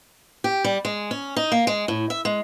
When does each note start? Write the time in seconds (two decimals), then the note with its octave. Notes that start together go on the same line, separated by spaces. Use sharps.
0.44 G4
0.64 G3
0.85 G#3
1.11 C#4
1.36 D#4
1.52 A#3
1.67 G#3
1.88 A2
2.10 E5
2.25 G#3